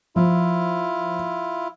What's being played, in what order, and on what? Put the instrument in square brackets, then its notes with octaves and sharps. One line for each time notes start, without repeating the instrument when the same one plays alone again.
[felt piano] F3 [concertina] E4 F4